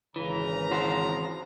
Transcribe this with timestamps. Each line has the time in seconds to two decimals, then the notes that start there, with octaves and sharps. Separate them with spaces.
0.16 G#1 C#3 E3 A#5
0.71 E3 F#4 C5